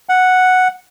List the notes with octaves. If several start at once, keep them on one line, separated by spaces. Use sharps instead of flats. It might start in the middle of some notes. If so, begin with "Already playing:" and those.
F#5